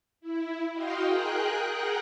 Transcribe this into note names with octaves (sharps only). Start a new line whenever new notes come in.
E4
F#4 D#5 F5 G5 C6
G#4 A#4 G5 F#6
G#4 A#4 F#5 G5